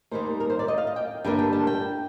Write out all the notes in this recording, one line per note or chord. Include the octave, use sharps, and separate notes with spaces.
D#2 D#3 G3 A#3 C5
A#4
C5
D5
D#5
F5
D#5
G5
G2 D3 G3 A#3 D4 G5
G5
A5
G5